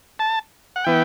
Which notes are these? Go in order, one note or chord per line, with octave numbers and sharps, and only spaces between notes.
A5
F#5
E3 B3 G5